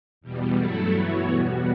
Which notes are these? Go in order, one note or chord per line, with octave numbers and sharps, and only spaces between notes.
E2 B2 G3
G2 F#3 A3 E4 A4
E3 B3 F#4 C#5
E2 B2 G3 B3 F#4